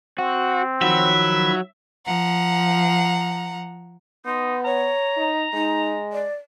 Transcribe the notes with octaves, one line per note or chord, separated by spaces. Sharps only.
C4 F#4
D#3 F3 F#3 E5 B5
F3 F#5 A#5
B3 D#4 C6
C#5 A#5
D#4
G#3 D#4
D5